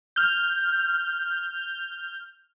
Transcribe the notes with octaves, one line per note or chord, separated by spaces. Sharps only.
F6 G6